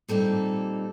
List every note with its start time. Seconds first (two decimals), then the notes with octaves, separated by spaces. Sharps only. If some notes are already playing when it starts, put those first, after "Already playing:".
0.08 A#2 G3 C4 D#4 A4